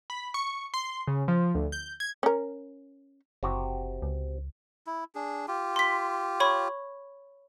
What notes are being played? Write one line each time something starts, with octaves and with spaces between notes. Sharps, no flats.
B5
C#6
C6
C#3
F3
D2
G6
G#6
C#4 A#4
F#1 C3 F#4 G4
C#2
E4
D4 G#4
F4 G4
C6 B6
C#5 B5 C#6